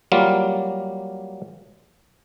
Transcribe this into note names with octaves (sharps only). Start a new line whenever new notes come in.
F#3 G3 A#3 F4